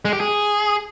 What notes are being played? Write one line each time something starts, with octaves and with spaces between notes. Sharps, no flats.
G#3
G4
G#4